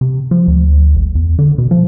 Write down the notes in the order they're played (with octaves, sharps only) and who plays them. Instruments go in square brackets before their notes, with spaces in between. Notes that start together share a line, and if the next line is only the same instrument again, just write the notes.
[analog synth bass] C3
F3
D2
G#1
E2
D3
B2
F3